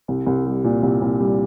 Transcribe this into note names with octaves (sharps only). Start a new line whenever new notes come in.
C2
C2
G3
A#2
C2
C2
G3